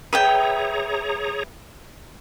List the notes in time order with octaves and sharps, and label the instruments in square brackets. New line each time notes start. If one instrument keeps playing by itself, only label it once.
[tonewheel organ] G#4 C#5 A#5 [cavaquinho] B4 E5 G5